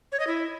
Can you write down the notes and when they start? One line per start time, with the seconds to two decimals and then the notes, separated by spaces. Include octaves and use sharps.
0.12 C#5
0.20 D#5
0.27 E4